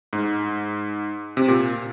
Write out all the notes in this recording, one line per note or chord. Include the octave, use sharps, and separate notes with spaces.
G#2
C3
A#2